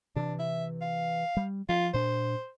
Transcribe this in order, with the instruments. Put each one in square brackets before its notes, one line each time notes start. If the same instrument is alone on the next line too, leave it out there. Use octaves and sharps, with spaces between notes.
[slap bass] C3 E3 [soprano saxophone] D4
[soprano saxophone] E5
F5
[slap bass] G3
[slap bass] F3 [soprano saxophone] F4
[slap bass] A#2 D4 [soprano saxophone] C5